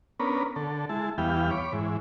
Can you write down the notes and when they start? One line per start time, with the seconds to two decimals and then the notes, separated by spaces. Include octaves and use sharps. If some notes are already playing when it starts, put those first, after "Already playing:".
0.20 B3 C#4 D4 A#4 B4
0.56 D3 A4
0.89 G#3 E4 A5
1.18 E2 E3 G3 B3 F5 G5
1.51 C#5 B5 D6
1.73 G#2 E3